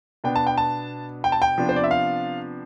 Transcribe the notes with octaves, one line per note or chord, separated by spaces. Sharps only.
B2 B3 D4 G5
A5
G5
A5
G5
A5
G5
C3 F3 B3 D4
C5
D5
E5
F5